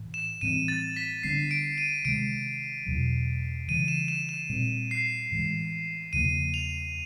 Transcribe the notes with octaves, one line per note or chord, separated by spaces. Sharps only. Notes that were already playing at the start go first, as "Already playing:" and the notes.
Already playing: A2 E3
E7
A2 E3 G3 C4 D#7
A6
B6
D3 G3 B3 D4 C7
D7
D#7
C3 D#3 G#3 D7
E2 B2 F#3
C#3 E3 G3 D#7
E7
E7
E7
A#2 G3 C4
C7
A2 E3 G#3
E2 C#3 F3 A#3 D#7
F7